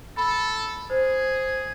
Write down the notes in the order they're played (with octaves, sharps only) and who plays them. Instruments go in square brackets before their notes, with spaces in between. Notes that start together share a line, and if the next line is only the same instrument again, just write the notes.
[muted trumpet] A4 [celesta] B5
[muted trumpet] G#4 [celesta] C5